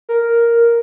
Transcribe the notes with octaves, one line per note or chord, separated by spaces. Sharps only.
A#4